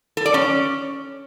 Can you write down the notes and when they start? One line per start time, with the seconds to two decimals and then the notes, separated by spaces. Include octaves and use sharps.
0.17 A4
0.26 D5
0.34 C#4